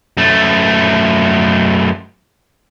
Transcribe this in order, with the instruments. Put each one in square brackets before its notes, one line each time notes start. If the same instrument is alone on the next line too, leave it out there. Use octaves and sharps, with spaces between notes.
[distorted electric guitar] F#2 A3